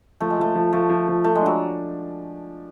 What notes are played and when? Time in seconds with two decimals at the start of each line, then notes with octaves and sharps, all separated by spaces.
0.20 F3 A3
0.30 G#3
0.39 F3 A3
0.55 F3
0.72 F3 A3
0.89 F3
1.07 F3
1.24 F3 A3
1.35 G#3
1.41 F#3 D4